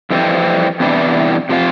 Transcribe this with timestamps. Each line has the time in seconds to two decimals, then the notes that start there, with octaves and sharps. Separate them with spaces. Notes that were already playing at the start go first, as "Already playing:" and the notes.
0.10 F2 E3 G3 C4
0.80 E2 C3 E3 G3 D4
1.49 C3 F3 C4 F4